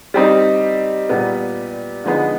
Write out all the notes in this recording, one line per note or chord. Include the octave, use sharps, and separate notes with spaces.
G3 C4 D#4
A#2 G3 B3
D3 F3 G#3 B3 D#4